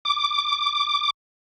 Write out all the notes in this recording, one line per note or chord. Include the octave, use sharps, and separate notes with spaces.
D6